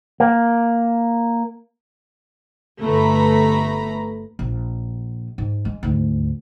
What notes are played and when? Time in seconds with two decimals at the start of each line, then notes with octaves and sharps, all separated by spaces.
0.20 A#3
2.81 G1 A3 B4 A#5 B5
4.39 A#1
5.38 G#2
5.65 G#3
5.83 D2 G#2